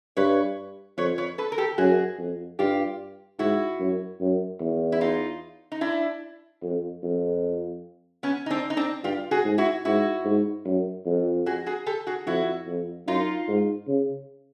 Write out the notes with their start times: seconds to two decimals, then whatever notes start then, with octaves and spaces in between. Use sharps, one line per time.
0.17 G2 B4 C#5
0.98 F2 B4 C#5
1.18 B4 C#5
1.38 A4 B4
1.52 A#4
1.58 G4 A4
1.78 F#2 F#4 G#4
2.18 F2
2.59 G2 F4 G4
3.39 G#2 E4 F#4
3.80 F#2
4.21 F#2
4.60 E2
4.92 E4
5.01 D#4 F4
5.72 D#4
5.81 D4 E4
6.62 F2
7.03 F2
8.23 B3 C#4
8.46 D#4
8.51 C4 D4
8.70 D#4
8.77 C4 D4
9.04 G2 F4 G4
9.31 F#4 G#4
9.44 G#2
9.58 E4 F#4
9.85 G#2 E4 F#4
10.25 G#2
10.66 F#2
11.06 F2
11.46 F#4 G#4
11.66 F#4 G#4
11.86 G4 A4
12.07 F#4 G#4
12.27 F2 E4 F#4
12.67 F2
13.07 F#2 D#4 F4
13.48 G#2
13.88 C#3